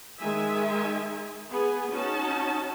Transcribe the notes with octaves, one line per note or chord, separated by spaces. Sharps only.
D#3 G#3 E5 G#5
B3 G#4 G#5
C#4 D#4 F#4 A5